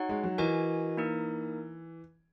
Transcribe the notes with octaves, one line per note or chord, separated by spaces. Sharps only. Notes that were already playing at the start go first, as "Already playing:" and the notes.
Already playing: D#4 F#4 C#5 F#5
G#3
F#3
E3 F#4 A#4 D#5 G#5
A#3 D#4 A#4